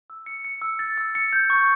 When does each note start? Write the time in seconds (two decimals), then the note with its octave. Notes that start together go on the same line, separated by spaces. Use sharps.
0.10 E6
0.26 C#7
0.45 C#7
0.62 E6
0.79 A6
0.98 E6
1.15 C#7
1.33 G6
1.50 C#6